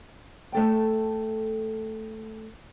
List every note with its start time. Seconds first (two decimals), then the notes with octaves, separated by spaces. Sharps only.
0.52 A3 A4 G5